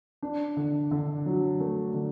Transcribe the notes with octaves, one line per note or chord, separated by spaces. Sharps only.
D4
D3
D3
F#3
A3
D3